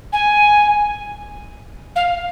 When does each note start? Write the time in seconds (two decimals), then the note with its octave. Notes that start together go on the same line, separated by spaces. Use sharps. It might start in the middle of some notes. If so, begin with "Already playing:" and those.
0.12 G#5
1.95 F5